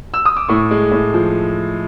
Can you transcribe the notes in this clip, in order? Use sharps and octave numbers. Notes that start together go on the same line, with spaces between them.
E6
D#6
D6
A2 C#6
G#3
A2
F3